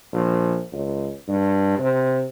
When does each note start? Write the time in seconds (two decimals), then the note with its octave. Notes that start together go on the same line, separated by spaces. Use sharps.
0.13 A#1
0.72 C#2
1.28 G2
1.79 C3